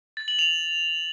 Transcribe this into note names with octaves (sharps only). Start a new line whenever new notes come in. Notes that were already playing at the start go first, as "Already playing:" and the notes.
A6
F#7
F7